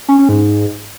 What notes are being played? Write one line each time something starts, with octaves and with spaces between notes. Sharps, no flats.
C#4
C#4
G#2